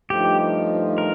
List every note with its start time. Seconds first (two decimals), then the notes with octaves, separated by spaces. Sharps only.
0.10 G2 F3 A3 D#4 G4
0.98 A#4